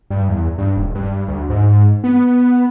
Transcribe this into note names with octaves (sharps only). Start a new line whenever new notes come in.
G2
E2
G2
D#1
G2
D2
G#2
B3